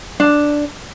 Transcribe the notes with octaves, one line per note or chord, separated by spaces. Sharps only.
D4